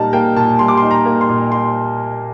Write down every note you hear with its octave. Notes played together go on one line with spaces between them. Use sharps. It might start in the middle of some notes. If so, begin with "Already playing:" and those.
Already playing: A#2 G3 A#3 D#4 A5 A#5
A#3 G5
A#2 A5
G3 C6
D6
D#4 C6
A#5
A#3
C6
A#2
G3 C6